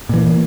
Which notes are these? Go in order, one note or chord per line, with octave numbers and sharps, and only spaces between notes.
A#2 E3 A#3